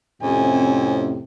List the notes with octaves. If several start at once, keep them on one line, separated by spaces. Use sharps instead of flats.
F2 A2 C3 C#4 G#5